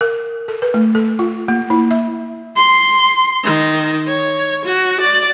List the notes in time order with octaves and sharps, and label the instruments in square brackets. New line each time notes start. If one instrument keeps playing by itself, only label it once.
[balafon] A#4
A4
B4
A3
A4
F4
A#3
E4
E5
[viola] C6
D#3
C#5
F#4
D5